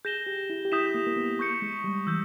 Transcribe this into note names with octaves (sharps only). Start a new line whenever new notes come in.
G#4 G6 A#6 E7 G7
G4
E4
G4
E4 D#6 G6 B6 E7
A#3
A#3
B3
C#6 G6 C#7
G#3
G3
E3 E6 G6